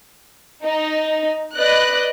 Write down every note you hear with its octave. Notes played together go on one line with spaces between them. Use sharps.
D#4
B4 D5 D#5 F#6